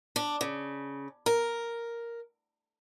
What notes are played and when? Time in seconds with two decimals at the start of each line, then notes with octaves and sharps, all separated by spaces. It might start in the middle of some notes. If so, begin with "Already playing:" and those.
0.16 D4
0.41 C#3
1.26 A#4